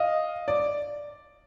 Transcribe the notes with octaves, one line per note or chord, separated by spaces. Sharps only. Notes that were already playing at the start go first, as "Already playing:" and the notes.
Already playing: D#5 F5
D5